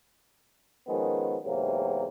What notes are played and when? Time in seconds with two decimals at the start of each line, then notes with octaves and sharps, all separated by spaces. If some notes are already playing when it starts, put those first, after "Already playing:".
0.87 D#3 F3 G#3 B3 C#4
1.44 E2 G#2 C3 F#3 A#3